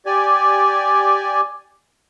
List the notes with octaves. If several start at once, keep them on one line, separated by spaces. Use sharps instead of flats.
G4 D5 G#5